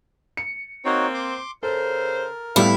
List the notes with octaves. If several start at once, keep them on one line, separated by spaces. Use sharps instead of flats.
C#7
A#3 C4 D#4 F#4 C#5
C6 D6
C#3 A4 A#4 C5
A2 G3 B3 E4 F5